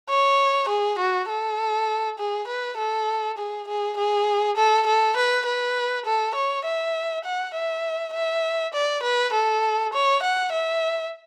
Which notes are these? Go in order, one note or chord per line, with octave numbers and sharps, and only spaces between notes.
C#5
G#4
F#4
A4
G#4
B4
A4
G#4
G#4
G#4
A4
A4
B4
B4
A4
C#5
E5
F#5
E5
E5
D5
B4
A4
C#5
F#5
E5